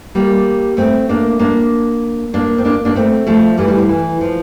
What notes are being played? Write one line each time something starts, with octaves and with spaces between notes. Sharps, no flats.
G3 A#3
A3 C4
A#3 D4
A#3 D4
A#3 D4
C4
A#3 D4
A#3 D4
A3 C4
F3 A3
E3 G3
E3 G3
F3
E3
F3